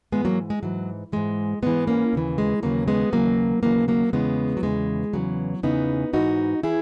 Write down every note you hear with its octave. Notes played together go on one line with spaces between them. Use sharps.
G#2 E3 G#3 B3
F#3 A#3
G#3
G#2 E3 F#3
G#2 E3 G#3
G#2 E3 G#3 B3
A#3 C#4
D#2 C#3 E3
G#3
D#2 C#3 E3 F#3 A#3
G#3 B3
D#2 C#3 E3 F#3 A#3
D#2 C#3 E3 F#3 A#3
F#3 A#3
E2 C#3 E3 G#3 B3
F#3
E2 C#3 E3 G#3
E2 C#3 E3 F#3
E2 C#3 E3 B3 D#4
G#2 E3 D#4 F#4
E3 E4 G#4